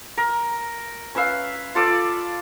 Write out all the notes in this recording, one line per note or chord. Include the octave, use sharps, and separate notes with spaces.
A#4
C#4 B4 E5 F5
F4 A4 D5